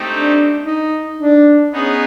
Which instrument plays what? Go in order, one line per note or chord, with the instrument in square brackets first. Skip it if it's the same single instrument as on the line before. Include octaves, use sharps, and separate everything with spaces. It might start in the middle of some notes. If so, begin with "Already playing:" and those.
Already playing: [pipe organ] A3 C4 D#4 G4
[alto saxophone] D4
D#4
D4
[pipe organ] B3 D#4 G#4 B4 [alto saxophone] C#4